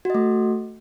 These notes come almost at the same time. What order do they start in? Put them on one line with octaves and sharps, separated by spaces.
F#4 D#5 A3